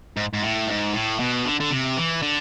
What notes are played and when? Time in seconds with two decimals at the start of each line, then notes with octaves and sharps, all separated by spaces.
0.17 G#2
0.33 G#2
0.43 A2
0.68 G#2
0.94 A2
1.19 B2
1.45 D3
1.60 D3
1.71 C3
1.97 E3
2.22 D3